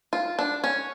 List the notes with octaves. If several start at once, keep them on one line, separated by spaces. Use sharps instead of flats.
F4
D4
C#4